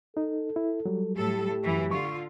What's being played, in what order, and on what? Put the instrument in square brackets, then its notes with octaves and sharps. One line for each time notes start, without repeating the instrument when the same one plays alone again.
[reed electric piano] D#4 [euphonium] A4
[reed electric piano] E4
F#3 G3
[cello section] A2 A4 [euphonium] G4
[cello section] F#2 E3
[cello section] D3 F4 [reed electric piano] C#6